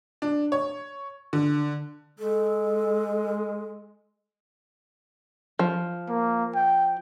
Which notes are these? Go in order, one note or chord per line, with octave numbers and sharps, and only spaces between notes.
D4
C#5
D3
G#3 A4
F3
A#3
G5